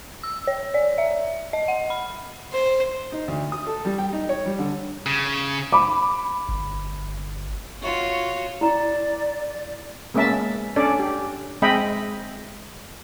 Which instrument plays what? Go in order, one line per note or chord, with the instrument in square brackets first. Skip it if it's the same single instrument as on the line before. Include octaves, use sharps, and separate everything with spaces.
[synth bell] E6
C#5
D5
E5
D#5
F#5
B5
[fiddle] C5
[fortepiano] D#4
D2
D#6
A4
G3
G5
D#4
C#5
G3
D3
[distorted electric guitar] C#3
[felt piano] B5 D6
[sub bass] G1
[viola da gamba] F4 F#4 C#5
[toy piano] E4 A#5 [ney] D5
[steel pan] G#3 A#3 B3 C#4 E5 A5
C#4 D4 A4 D5
G4
G#3 C4 D#5 E5 G5 B5